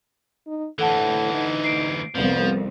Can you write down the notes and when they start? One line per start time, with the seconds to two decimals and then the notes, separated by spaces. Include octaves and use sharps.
0.47 D#4
0.79 D2 A2 E3 A4 F#5 A5
1.33 D#4
1.64 C7 D7
2.15 C2 F2 F3 B3